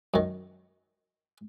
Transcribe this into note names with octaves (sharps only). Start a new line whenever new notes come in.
F#2 D#3